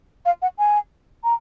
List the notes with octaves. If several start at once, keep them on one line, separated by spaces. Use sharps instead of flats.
F5
F#5
G#5
A#5